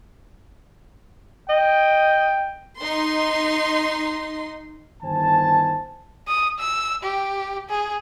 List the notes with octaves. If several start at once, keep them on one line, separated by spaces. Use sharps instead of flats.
D#5 G5
D#4 C6
G1 D#3 C5 G#5 A5
D#6
E6
G4
G#4